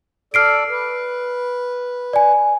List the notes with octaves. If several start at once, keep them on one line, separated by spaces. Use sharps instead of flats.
A4 D5 F6 C7 D7
B4
D5 G#5